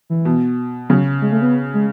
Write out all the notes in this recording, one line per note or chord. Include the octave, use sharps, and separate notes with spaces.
E3
B2
C#3 F#3
G#3
A3
B3
G#3